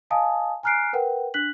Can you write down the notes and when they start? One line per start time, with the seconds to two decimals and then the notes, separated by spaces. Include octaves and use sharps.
0.10 D#5 F5 G#5 A5 D#6
0.63 G#5 A#5 F6 F#6 C7 D7
0.93 A#4 B4 F#5 G5
1.34 D4 F#6 B6 F#7